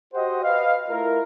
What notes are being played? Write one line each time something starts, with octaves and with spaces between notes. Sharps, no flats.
F#4 G4 C5 D#5 F#5
B4 D#5 F5
A3 E4 F4 A#4